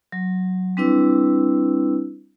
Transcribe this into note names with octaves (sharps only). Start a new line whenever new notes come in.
F#3
G3 C4 D4 E4 B4 E6